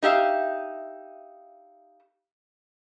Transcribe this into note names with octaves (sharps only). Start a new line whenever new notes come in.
D#4 G4 E5 F5